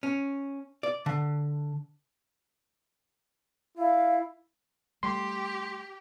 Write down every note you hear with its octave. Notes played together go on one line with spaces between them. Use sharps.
C#4
D5
D3
E4 F5
G3 A3 G4 C6